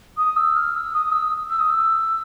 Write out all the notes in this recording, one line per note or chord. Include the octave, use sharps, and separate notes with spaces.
D#6
E6
F6
E6
D#6
E6
E6
D#6
E6